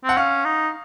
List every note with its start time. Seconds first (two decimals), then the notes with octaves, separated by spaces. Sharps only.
0.04 C4 F#5
0.17 C#4 F5
0.45 D#4